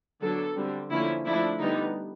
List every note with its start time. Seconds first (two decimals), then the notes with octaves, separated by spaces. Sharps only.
0.21 D3 F#3 B3 D4 A4
0.56 D3 G3 C4
0.91 D3 F3 A#3 C#4 E4
1.26 F3 A3 D4 E4
1.61 D3 G3 B3 D#4